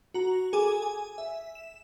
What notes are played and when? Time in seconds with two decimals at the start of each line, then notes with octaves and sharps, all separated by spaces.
0.14 F#4 A#5
0.53 G#4 A4 G#5 D6
0.82 G#5
1.18 E5
1.55 E7